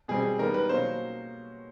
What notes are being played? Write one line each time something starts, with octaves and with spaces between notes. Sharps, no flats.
B2 G3 C4 G#4
D#3 G3 B3 A#4
B4
B2 F#3 A#3 C#4 C5